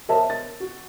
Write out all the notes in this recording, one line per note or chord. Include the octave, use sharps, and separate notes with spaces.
A#4 C5 C#5 D#5 E5 A5
A6
F#4